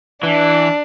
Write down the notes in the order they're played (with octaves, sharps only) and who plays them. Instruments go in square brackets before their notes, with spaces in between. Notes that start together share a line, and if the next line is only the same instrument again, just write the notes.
[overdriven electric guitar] E3 [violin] D4